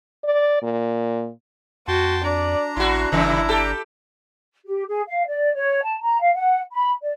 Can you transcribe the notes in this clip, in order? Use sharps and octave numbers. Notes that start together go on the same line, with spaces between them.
D5
A#2
F2 F#4 G5 A5 C6
D4 D5 A#5
A1 E4 F#4 C6
G1 C#3 E3 G3 E4
G4 A4
G4
G#4
F5
D5
C#5
A5
A#5
F5
F#5
B5
D5